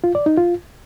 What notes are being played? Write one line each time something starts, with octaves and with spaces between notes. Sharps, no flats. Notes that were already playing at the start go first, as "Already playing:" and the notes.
F4
D5
D#4
F4